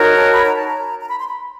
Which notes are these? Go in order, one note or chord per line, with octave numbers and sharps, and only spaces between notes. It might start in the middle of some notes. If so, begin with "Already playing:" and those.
Already playing: D#4 F#4 A#4 C#5
A5
B5
A#5
A5
A#5
A#5
B5
C6
B5